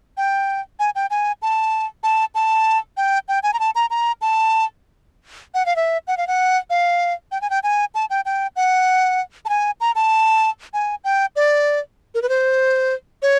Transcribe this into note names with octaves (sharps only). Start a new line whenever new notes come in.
G5
G#5
G5
G#5
A5
A5
A5
G5
G5
G#5
A#5
A5
A#5
A#5
A5
F#5
F5
E5
F#5
F5
F#5
F5
G5
G#5
G5
G#5
A5
G5
G5
F#5
A5
G#5
A#5
A5
G#5
G5
D5
A#4
B4
C5
C#5